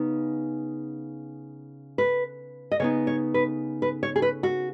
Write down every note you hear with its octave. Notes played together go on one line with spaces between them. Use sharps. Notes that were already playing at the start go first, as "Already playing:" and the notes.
Already playing: C#3 B3 D#4
B4
D#5
C#3 B3 D#4 C#5
C#5
B4
B4
C#5
G#4
B4
F#4